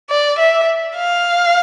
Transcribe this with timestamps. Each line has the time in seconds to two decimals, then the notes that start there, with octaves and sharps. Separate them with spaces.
0.10 D5
0.38 E5
0.96 F5